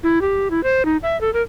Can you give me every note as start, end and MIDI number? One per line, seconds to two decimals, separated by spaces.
0.03 0.21 64
0.21 0.48 67
0.51 0.63 64
0.64 0.85 72
0.85 0.97 63
1.03 1.19 76
1.21 1.33 69
1.34 1.42 70